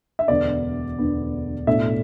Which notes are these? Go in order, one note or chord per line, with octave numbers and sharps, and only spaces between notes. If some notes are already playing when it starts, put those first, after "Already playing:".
E5
E1 D2 D3 B3 D5
E1 D2 D3 B3
B1 A2 A3 D4 E5